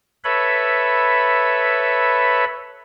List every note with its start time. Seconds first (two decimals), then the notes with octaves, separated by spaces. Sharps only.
0.24 A4 B4 C#5 E5 B5